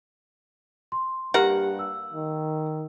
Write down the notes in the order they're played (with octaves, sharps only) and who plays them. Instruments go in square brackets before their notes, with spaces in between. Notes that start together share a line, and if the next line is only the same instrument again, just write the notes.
[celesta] C6
[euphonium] G2 [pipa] A#3 A#4 F#5 [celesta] G4
[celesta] E6
[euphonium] D#3